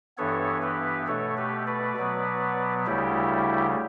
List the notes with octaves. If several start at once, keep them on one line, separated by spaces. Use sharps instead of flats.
G2 E3 B3 A4 C#5
G4 B4
B2 A3 A4 C#5
G4 B4
B4 D5
B2 F#3 B3
D2 C#3 G3 E4 G4